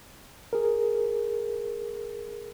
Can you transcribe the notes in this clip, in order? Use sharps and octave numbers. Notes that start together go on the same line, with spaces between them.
G#4 A#4